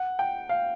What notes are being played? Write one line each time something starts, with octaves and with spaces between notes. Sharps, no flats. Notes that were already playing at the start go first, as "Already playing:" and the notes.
Already playing: F#5
G5
F5